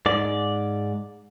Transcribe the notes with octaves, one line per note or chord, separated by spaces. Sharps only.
G#2 D5